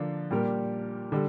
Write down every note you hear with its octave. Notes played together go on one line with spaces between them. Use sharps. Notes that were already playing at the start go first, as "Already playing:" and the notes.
Already playing: D3 F3 A#3 D4
A#2 G3 D4 G4 A#4
D3 G3